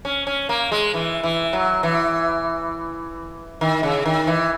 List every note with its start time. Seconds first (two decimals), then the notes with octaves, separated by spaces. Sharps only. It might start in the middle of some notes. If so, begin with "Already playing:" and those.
0.05 C#4
0.27 C#4
0.49 A#3
0.72 G#3
0.94 E3
1.23 E3
1.53 F#3
1.83 E3
3.61 D#3
3.83 C#3
4.06 D#3
4.27 E3